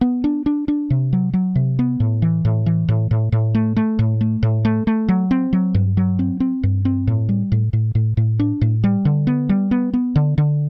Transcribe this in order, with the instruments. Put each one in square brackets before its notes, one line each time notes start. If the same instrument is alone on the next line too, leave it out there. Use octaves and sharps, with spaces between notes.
[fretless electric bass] B3
D4
D4
D4
C3
F#3
F#3
C3
B3
A2
E3
A2
E3
A2
A2
A2
A3
A3
A2
A3
A2
A3
A3
F#3
C4
F#3
G2
F#3
C4
C4
G2
C4
A2
G3
A2
A2
A2
A2
D4
A2
G3
D3
B3
G3
B3
B3
D3
D3